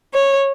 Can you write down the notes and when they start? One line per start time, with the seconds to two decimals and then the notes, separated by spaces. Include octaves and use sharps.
0.14 C#5